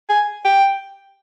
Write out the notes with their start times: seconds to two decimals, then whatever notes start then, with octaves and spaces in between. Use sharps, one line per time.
0.09 G#5
0.45 G5